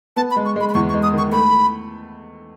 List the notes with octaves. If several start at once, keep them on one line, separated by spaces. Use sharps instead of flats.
B3 A5
B5
G#3
C#6
G#3 B5
B5
E2 C#6
C#6
G#3
D#6
D#3 C#6
A3 B5